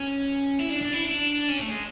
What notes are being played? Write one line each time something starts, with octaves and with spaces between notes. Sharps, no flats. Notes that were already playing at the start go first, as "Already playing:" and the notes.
Already playing: C#4
E4
D4
D4
E4
D4
C#4
A3
G#3